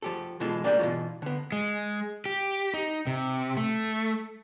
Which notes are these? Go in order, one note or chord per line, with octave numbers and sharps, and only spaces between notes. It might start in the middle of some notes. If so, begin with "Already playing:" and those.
F3 G4 A4
B2 E3 G#3 F4 A4
G3 A#3 D4 F5 G5
B2 E3 F#3 A3 F4
D3 B3
G#3
G4
D#4
C3
A3